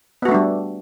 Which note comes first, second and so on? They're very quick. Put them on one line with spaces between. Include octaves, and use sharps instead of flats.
B3 F#4 A3 D4 G3